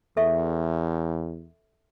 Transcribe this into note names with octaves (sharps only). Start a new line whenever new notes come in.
E2 A4 E5 C#6